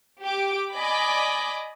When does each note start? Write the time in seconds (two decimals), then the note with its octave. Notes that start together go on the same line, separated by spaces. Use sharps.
0.22 G4 D6
0.72 D5 D#5 G#5 B5 D6 B6